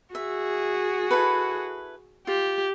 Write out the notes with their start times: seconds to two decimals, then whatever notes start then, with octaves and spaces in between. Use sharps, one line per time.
0.15 F#4 G#4 E5
1.11 E4 A4 B4
2.27 F4 G4